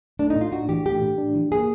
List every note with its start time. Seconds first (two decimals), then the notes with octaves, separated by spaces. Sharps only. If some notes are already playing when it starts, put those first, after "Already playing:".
0.19 A3 D4
0.30 D#4
0.36 A2
0.41 F4
0.52 D4 F#4
0.69 E3 G4
0.86 A3 G4
1.02 A2
1.18 D4
1.35 E3
1.51 A#3 G#4